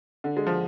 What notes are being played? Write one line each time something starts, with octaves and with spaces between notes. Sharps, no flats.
D3
G#3
F3